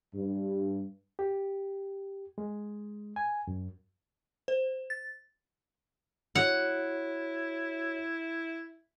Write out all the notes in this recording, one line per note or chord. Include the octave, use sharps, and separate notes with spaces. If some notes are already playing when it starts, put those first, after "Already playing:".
G2
G4
G#3
G#5
F#2
C5
A6
E4 F#4 C#5 F#5